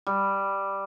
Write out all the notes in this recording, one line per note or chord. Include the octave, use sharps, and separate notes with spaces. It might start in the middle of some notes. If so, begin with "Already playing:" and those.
G3